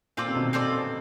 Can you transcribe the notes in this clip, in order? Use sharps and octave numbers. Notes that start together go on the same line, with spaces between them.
A#2 C4 F4 A4 D5
C3
B2
C4 F4 A4 D5